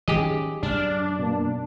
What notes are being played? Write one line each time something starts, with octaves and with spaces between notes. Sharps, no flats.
D#3 F#3 C#4 G4 G#4 D#5
F#2 D4 D5 F6
B2 A#3